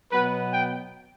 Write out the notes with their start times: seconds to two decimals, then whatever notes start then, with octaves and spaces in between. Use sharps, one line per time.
0.12 B2 F#3 B3 B4
0.51 G5